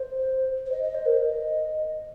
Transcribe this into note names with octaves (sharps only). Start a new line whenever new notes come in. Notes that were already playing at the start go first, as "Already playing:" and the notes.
Already playing: C5
C5
D#5
D#5
C5
A#4
D#5